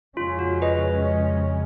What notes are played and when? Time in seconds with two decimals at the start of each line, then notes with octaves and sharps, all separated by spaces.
0.17 F2 C#3 G#3 C#4 F4
0.39 F#4
0.62 B4 D#5